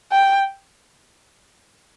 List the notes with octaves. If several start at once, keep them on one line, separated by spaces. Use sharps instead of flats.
G5